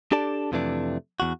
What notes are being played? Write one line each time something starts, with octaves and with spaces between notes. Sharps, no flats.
D4 G4 A4 D5 A5
F2 C3 E3 A3 D4
E2 F#4